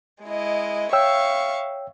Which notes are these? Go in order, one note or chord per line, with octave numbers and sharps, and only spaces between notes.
G#3 E4 D#5
C#5 E5 F5 G5 C#6 E6